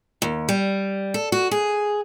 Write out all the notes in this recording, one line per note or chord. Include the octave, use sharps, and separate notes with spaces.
D#2
G3
A4
F#4
G#4